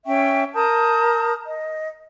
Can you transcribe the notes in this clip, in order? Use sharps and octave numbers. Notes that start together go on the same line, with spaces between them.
C#4 E5 G5 C#6
A#4 A5 D#6 G6
D#5